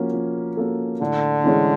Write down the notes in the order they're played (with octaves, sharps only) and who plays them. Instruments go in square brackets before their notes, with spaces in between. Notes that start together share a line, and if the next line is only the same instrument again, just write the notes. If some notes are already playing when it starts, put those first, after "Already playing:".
Already playing: [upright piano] F3 A#3 C#4 F#4
F3
A#3 C#4 F#4 A4
[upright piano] A2 [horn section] D3
[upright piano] E3 G#3 C#4